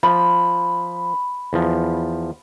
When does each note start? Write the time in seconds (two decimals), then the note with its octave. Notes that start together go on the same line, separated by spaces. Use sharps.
0.03 F3 B5
1.53 E2 F3